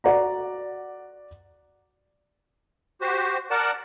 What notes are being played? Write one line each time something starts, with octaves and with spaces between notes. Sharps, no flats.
F#4 D5 F#5 A#5
F#4 G4 C5
A#4 D5 F#5 A5